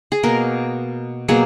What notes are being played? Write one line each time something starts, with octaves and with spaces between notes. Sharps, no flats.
G#4
B2 A#3 A#4
B2 F#3 A#3 G#4